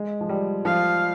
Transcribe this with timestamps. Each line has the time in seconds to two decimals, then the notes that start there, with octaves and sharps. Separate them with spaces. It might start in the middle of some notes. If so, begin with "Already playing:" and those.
Already playing: G#3
0.21 F3
0.29 G3
0.65 F3 F5